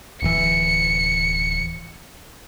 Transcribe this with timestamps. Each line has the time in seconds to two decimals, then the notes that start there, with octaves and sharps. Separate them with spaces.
0.22 D1 E3 C#7